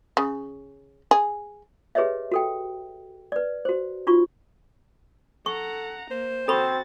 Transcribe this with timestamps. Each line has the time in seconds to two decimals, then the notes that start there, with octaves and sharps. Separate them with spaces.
0.17 C#3
1.11 G#4
1.95 G4 G#4 B4 C#5 D#5 E5
2.32 F#4 A4 G5
3.32 B4 D5
3.65 F#4 C5
4.07 D#4 F4 F#4 C#6
5.46 A4 F#5 A#5 C#6
6.11 A#3 C5
6.48 C4 F#4 A4 B5 C#6 A6